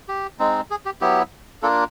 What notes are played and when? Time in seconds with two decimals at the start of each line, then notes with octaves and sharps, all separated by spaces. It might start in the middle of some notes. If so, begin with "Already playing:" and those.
0.08 G4
0.39 G#3 C4 D#4
0.71 G#4
0.85 G4
1.01 F#3 B3 E4 G4
1.62 A#3 D4 F4 A4